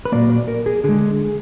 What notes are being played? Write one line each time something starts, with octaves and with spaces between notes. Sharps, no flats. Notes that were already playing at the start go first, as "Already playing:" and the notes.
B4
A#2 F#3 A#3 D5
D5
A#4
G#4
D3 G#3 G#4